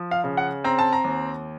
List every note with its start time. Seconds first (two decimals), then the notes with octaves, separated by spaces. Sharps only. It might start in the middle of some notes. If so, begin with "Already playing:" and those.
Already playing: F3
0.11 F5
0.24 C#3
0.37 F#5
0.64 C4 A#5
0.79 A5
0.93 A#5
1.04 D#2